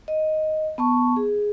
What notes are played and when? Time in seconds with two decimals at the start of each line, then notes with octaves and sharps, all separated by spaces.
0.08 D#5
0.78 B3 A5 C#6
1.16 G#4